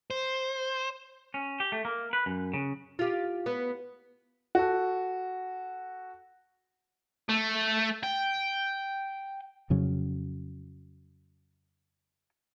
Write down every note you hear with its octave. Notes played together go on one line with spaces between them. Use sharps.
C5
C#4
G4
A3
A#3
B4
F#2
C#3
F4 G4
B3
F#4 A4
A3
G5
F2 C#3 F#3